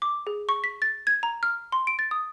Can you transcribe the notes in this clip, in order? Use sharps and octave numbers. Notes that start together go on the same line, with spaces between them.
D6
G#4
C#6
B6
A6
G#6
A#5
F6
C6
D7
A6
D#6